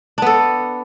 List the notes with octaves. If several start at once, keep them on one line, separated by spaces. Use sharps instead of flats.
B3 D4 A4